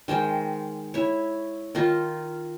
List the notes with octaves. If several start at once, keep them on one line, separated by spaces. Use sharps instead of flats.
D#3 G#3 C5 G5
E4 C#5
D#3 D#4 F4